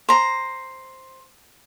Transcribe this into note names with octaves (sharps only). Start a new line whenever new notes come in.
C5 A#5